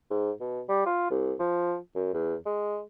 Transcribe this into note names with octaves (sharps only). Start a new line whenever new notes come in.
G#2
B2
G3
F4
C2
F3
F#2
E2
G#3